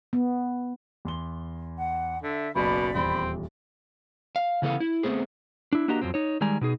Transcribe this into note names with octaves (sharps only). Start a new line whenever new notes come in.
B3
E2 C6 G7
F#5
D3 E5
F#1 B1 B2 D5 B5
D#1 E2 C4
F5
C#3 E3 B3 A4 F5
E4
A3 B3 C4 G#4
D4 E4
A#3 D4 F#4 G4 D#5 A#5
F2 F3 F#3 C4
D#4 C#5
D#3 G3 G#3 D5 G#5 A#5
B2 D#4 G#4